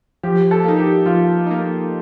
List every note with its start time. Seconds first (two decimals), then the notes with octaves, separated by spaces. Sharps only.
0.23 F3 G4
0.51 A4
0.65 A#3 D#4
0.78 G4
1.06 F3 F4
1.47 A#3 D#4